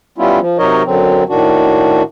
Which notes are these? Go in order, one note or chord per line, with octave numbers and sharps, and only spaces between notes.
G3 B3 C#4 E4 F4
F3
C3 F#3 D#4 A#4 C#5 D#5
F#2 D3 F#3 C4
A2 D#3 D4 F#4